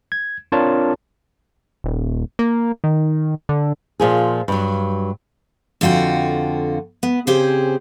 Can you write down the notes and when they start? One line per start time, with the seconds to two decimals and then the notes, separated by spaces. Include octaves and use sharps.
0.12 G#6
0.52 C4 D4 F4 A#4 C#5 A5
1.84 D#1
2.39 A#3
2.84 D#3
3.49 D3
4.00 A#2 F3 G#4
4.48 G2 F#3
5.81 F2 D3 F4 F#4 G5
7.03 B3
7.27 C#3 C4 G4 G#4 C5